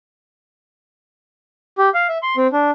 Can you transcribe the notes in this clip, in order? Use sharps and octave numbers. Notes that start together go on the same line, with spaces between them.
G4
F5
E5
C6
C4
D4